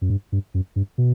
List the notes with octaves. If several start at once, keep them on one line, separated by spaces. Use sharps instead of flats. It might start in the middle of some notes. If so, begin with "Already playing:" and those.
F#2
G2
G2
F#2
G2
B2